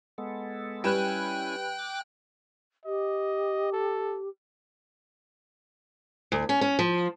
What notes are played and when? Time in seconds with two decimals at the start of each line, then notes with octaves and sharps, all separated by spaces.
0.18 G#3 B3 A4
0.84 G3 C#4 E4 B4 G5 G#5 F#6 E7
1.79 D6
2.85 G4 D#5
3.73 A4
6.32 D2
6.49 C#4
6.61 C#4
6.79 F3